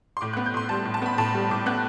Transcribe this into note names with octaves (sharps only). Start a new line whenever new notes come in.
C6
A2 D6
F#6
B3
G6
A2 C6
G3 A5
A2
A5
B3 B5
A2 A5
G3
A2 D6
B3 F#6